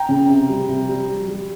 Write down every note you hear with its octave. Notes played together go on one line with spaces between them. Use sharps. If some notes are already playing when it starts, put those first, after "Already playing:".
Already playing: G5 A#5
C#3
C3
G3
C3
G3
G3
G3